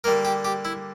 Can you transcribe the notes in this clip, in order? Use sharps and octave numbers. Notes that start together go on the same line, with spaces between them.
D3 G3 A#3 A#4
G4
G4
E4